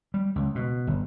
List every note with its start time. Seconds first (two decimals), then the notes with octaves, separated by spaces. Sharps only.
0.14 G3
0.36 C#2
0.55 B2
0.87 G1